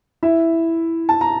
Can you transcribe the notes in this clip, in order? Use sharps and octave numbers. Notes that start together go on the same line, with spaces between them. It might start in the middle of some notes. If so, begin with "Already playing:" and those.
E4 E5
A5
A#5